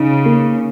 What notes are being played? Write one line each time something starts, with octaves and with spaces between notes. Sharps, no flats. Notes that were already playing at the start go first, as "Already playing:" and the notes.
Already playing: C#3 D#4
A#3